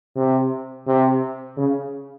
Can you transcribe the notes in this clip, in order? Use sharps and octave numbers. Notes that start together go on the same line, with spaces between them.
C3
C3
C#3